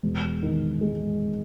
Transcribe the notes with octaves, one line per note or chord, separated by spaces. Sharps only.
E1
D#3
G#3